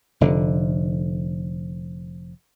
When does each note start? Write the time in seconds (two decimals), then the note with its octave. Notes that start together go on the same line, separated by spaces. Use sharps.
0.21 F1 D3